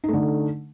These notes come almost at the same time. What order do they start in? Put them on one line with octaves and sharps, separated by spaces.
D#4 A3 D3